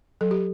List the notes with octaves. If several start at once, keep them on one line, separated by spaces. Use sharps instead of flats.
F#3 A4
G4